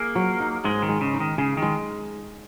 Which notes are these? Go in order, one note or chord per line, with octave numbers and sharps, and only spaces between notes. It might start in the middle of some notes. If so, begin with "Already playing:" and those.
Already playing: A#3 G#4
F#3
D#4
G#2 G#3
D#3
G#3
C#3
D#4
D#3
C#3 G#4
D#3
G#3